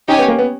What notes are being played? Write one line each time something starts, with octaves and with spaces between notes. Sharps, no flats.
C#4 D#4 G4 C#5 G#5
B3
A#3
B3